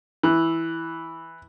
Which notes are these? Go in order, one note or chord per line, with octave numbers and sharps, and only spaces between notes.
E3